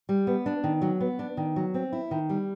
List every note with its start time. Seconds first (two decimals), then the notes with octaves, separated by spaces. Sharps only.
0.09 G3
0.27 B3
0.46 D4
0.64 D#3
0.82 F#3
1.01 B3
1.19 D4
1.37 D#3
1.56 F#3
1.74 C4
1.93 E4
2.11 D#3
2.29 G3